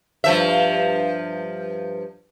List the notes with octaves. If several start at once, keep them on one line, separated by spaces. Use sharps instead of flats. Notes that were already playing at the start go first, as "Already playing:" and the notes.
G2 F3 E5